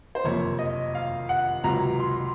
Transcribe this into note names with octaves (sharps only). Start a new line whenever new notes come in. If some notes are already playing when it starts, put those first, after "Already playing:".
C5
F#1 F2 C3 F3 A#3 C#5
D#5
F5
F#5
C#2 C3 F#3 A#5
C6